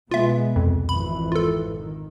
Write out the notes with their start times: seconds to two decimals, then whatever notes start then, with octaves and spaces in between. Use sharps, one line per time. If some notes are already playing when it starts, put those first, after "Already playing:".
0.11 B2 G#3 B3 F4 E5
0.56 C2 F2
0.89 G#1 F2 E3 B5
1.32 F4 A4
1.76 D#3